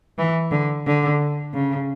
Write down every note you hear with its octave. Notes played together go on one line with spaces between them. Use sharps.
E3
D3
D3
C#3